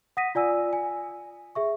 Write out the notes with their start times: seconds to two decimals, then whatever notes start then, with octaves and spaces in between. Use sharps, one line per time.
0.17 F#5 D#6 A#6 B6 D#7
0.35 F4 D5 G#5 E6
0.73 G#5
1.55 G#4 E5 C#6